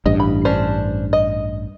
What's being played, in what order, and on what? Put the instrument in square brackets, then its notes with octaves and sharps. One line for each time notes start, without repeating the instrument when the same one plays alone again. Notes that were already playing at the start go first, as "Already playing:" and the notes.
[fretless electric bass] A1 G2 [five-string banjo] D#5
[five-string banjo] B5
C#4 D4 C5
D#5